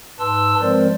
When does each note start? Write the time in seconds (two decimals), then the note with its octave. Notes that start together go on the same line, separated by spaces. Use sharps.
0.20 G#2 B4 A5 C6 E6
0.61 F3 G#3 C4 A#4 C5 D5